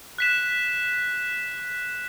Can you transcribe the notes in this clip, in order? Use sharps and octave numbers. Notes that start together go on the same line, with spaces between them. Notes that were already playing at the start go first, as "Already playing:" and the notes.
F#6 B6 E7